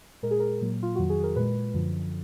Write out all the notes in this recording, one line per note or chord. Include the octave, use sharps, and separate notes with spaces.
A#2 G#3 A#4
G#4
A#4
A#2 F#3 A#3
F4
F2 D#3 F#3 F#4
G#4
A#4
A#2 G#3 B4
F#2 D3 F3